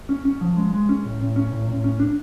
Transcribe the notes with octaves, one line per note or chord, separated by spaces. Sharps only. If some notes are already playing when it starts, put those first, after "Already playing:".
C#4
C#4
F3
G#3
G#3
C#4
A2
A2
C#4
A2
A2
C#4
D4